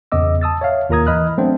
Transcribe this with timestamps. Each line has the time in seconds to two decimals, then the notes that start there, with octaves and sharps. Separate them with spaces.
0.12 E2 C#3 B3 D#5 D6 E6
0.41 A5 D#6 E6 A6
0.61 C#5 E5 F5
0.89 D#2 F4 A#4 A#5 D#6 G#6
1.07 E3 D#5 B5 D#6 F6 F#6
1.37 F#3 A3 B3 C4 D4 C5